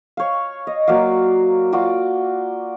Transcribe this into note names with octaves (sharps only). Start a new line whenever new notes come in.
C#5 F5
D#5
F#3 A#3 D5 F5
F4 F#4 D5